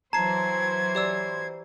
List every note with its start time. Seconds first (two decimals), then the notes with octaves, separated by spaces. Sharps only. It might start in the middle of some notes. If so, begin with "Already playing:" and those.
0.13 E3 F#3 C5 A5 A#5 G#6 C7
0.95 G4 D5 E6